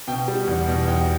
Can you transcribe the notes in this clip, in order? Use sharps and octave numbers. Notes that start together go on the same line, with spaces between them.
B2 G5
G3
E2
B2
E2 G5